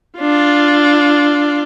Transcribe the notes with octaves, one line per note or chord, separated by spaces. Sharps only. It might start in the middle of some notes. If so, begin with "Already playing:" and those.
D4 F4